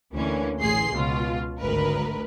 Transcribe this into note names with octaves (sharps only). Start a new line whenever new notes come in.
D2 D3 E3 A#3 C#4
A1 G#4 C6 C7
C#2 B2 F4
G#1 D2 A#4 B4